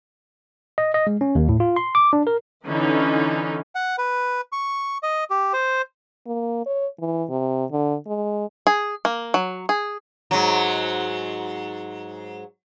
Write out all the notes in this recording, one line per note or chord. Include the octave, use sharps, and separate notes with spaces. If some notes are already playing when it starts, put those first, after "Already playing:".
D#5
D#5
G#3
C#4
D#2
A2
F4
C6
D6
D4
A#4
D3 E3 C#4 D#4
F#5
B4
C#6
D#5
G4
C5
A#3
C#5
E3
C3
D3
G#3
G#4
A#3
F#3
G#4
G#2 F#3